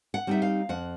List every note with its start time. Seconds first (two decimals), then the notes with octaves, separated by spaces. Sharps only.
0.14 F#5
0.27 G3 C4 D#4 E5
0.42 F5
0.69 F2 F#5